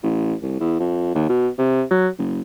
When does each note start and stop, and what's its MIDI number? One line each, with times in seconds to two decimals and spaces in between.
0.03 0.34 33
0.42 0.56 36
0.60 0.74 40
0.80 1.12 41
1.15 1.28 39
1.29 1.48 47
1.59 1.83 48
1.91 2.08 54
2.18 2.41 30